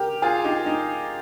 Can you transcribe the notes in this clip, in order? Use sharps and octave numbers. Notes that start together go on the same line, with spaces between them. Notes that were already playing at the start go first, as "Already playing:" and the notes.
Already playing: G4 A#4
F4 G#4
D#4 G4
D#4